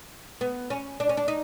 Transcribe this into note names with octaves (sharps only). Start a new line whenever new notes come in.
B3
C#4
D4
C#4
D4
D#4